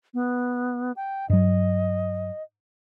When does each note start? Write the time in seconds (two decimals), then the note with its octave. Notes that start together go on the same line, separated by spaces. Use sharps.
0.14 B3
0.96 G5
1.30 G2 F#3 D#5